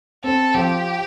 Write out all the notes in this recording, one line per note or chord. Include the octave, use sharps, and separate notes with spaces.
C4 A4
F3 G4